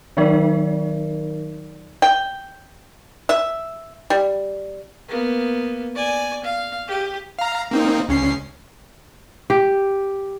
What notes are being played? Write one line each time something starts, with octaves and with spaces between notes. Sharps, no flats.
D#3 F#3 D#4 A#4 D5
G5
E5
G3
A#3 B3
D5 G#5
F5
G4
F5 A#5
A#3 C4 D#4
C#2 C#4 C7
G4